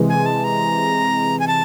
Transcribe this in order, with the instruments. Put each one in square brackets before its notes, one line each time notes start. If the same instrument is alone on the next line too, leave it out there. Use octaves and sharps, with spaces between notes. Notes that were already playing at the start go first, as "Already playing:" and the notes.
Already playing: [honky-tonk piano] C3 E3 G#3 C4
[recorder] G#5
A5
A#5
G#5
A5